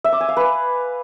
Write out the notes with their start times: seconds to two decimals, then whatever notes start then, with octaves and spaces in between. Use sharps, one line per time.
0.04 E5
0.12 D6
0.21 G#5
0.29 F5
0.37 B4